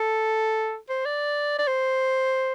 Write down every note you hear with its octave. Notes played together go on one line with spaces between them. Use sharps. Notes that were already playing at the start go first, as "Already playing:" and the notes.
Already playing: A4
C5
D5
D5
C5